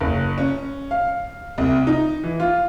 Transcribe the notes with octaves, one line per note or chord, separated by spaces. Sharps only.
F#1
C#4
F5
C2
D#4
E3
F4